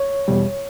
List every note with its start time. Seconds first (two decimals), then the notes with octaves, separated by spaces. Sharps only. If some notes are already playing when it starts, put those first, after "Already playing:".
Already playing: C#5
0.28 E2 B2 G3